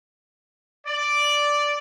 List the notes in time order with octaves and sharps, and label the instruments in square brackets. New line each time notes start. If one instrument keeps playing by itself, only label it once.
[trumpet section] D5